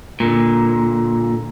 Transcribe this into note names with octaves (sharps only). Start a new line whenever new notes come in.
A#2 D3